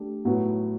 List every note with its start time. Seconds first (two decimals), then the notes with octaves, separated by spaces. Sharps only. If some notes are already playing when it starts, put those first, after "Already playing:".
Already playing: A3 D4 G4
0.25 A2 F#3 B3